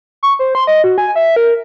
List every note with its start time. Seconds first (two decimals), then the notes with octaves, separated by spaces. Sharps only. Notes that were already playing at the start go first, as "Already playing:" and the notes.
0.23 C#6
0.39 C5
0.55 C6
0.67 D#5
0.84 F#4
0.98 G#5
1.16 E5
1.36 A#4